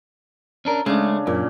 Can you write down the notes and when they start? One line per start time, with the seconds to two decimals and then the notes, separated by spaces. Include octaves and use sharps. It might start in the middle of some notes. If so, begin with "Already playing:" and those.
0.65 C#4 D4 A#4
0.86 C#3 G#3 A3 D4
1.27 F#2 A#2